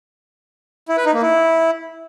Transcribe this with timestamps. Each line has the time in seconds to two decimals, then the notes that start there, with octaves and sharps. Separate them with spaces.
0.88 E4
0.97 B4
1.05 D#4
1.14 A#3
1.22 E4